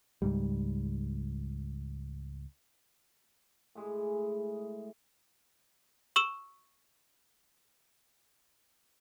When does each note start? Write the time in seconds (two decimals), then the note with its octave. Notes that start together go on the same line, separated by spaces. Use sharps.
0.22 C#2 G#2 G3
3.75 A2 G#3 G#4
6.16 C#6 E6 E7 G7